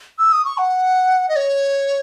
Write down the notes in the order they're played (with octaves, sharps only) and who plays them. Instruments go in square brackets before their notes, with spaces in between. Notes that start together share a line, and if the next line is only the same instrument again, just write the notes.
[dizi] E6
D#6
C#6
F#5
D#5
C#5